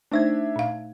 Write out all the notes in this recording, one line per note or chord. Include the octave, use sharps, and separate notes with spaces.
A3 D4 D#4 C5 E5 G#6
A#2 F5